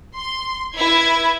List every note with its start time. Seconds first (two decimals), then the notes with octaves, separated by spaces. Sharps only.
0.15 C6
0.76 E4 B4 G#6